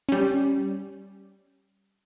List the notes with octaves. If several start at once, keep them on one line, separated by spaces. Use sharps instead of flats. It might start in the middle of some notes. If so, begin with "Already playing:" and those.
G3 C#4